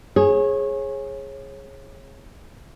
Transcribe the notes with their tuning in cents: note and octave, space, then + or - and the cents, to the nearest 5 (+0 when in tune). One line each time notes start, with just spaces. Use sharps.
G#4 +0 C#5 -30